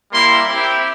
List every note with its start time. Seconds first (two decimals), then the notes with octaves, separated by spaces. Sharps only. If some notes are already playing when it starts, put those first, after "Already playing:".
0.12 G3 A#3 E4 C6
0.48 C4 E4 G4